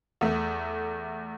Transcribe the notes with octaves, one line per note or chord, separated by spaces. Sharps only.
E2 A3